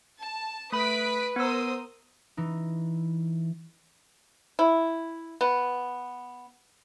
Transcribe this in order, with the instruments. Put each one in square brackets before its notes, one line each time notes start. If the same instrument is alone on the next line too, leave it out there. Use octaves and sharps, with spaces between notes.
[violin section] A5
[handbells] A3 B5 [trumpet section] B4 [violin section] D#6 B6 D7
[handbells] B3 E6 [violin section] A#4 C5 D#6
[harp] E3 D#4
[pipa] E4
B3